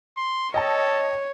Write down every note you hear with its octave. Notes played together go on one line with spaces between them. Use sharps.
C6
A4 C#5 D#5 G5 A5